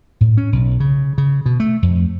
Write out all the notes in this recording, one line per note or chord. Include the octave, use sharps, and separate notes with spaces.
A2
C#4
B1
C#3
C#3
B2
A3
F2